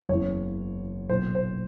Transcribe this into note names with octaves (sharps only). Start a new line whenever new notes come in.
F#1 E2 C#3 E3 C#5
B1 A#2 C5
C5